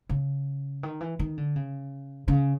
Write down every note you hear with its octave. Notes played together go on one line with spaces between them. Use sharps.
C#3
D#3
E3
D#3
D3
C#3
C#3